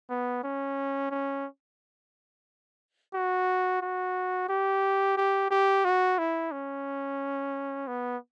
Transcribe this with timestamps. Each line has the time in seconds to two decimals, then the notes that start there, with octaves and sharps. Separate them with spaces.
0.10 B3
0.44 C#4
1.11 C#4
3.14 F#4
3.81 F#4
4.49 G4
5.17 G4
5.50 G4
5.85 F#4
6.18 E4
6.52 C#4
7.87 B3